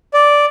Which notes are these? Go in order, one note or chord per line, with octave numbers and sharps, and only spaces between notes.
D5